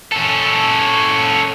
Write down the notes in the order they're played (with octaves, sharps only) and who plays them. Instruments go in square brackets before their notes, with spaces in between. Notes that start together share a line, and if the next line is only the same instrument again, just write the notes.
[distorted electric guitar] C#4 A4